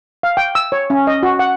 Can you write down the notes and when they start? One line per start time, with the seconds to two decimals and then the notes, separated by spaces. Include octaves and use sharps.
0.23 F5
0.37 G5
0.55 E6
0.72 C#5
0.90 C#4
1.07 D#5
1.23 F#4
1.39 F#5